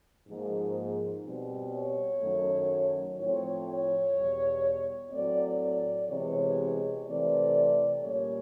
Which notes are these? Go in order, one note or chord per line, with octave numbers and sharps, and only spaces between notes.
G#2 F3 A#3
B2 G3 C4
C#5
F#2 D#3 F#3 A3
A2 F3 A3 C4 C#5
C#5
E2 B2 G3
A2 F#3 A3 C4 D5
D5
C3 E3 G#3 B3 C#5
C3 E3 A3 C4 D5
A#2 G3 A#3 C#4 C#5